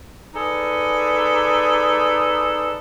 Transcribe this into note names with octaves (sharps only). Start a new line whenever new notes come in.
D#4 G#4 A4 B4 D5